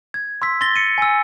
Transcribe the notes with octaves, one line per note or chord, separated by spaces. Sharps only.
G#6
C6 E6 B6
C6 A6 A#6 G7
C#7 D#7
G#5 E6